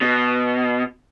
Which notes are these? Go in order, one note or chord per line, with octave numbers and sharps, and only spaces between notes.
B2